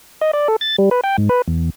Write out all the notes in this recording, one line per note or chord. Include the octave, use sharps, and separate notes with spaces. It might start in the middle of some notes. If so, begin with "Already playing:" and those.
D#5
D5
A4
A6
G3
B4
G5
G#2
B4
E2